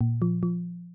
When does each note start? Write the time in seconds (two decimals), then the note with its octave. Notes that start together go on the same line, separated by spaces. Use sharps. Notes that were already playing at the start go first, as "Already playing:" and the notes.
0.01 A#2
0.22 F3
0.43 F3